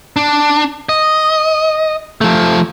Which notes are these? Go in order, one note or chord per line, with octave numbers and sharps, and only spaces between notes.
D4
D#5
F3 A3